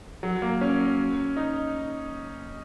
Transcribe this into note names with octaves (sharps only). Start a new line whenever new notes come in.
F#3
A#3
C#4
D#4